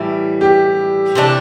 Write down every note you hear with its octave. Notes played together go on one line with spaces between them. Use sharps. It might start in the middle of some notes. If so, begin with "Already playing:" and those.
Already playing: A2 E3 G3 E4
G4
C3 E3 A3 D4